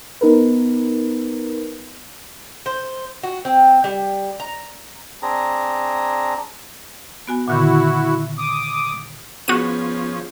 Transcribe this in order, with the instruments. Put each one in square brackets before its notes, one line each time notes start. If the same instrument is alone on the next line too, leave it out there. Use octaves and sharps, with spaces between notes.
[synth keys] B3 D#4 A#4 B4
[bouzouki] C5
F#4
C4
G3
A#5
[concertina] C4 D4 G#4 A#5
[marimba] B3 F#4 G#5
[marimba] A#2 D3 D#3 [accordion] E4 F#4
[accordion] D6 D#6
[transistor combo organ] F3 C#4 [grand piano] B3 [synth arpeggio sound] F#4 D#7 [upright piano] G#4